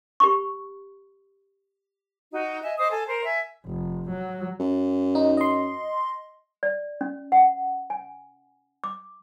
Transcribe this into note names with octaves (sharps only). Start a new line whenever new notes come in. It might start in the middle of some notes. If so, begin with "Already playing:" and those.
G4 B5 C#6
D#4 F#4
D#5 E5 G#5
C5 D#5 D6 D#6
A4 G#5
A#4 C5
E5 G#5
F1
F#3
F#2
D#4
D#5 C6
D5
C#4
F#5
G#5
D6